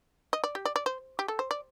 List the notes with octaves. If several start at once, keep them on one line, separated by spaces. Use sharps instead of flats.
D#5
D5
G4
D5
D5
C5
G4
A4
C5
D5